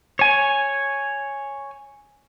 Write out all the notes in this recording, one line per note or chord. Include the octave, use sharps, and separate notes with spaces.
C#5 G#5